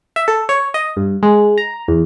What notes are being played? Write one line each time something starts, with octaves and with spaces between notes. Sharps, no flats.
E5
A4
C#5
D#5
G2
G#3
A#5
E2